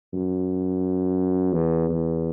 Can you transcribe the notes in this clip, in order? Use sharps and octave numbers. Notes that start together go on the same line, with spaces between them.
F#2
E2
E2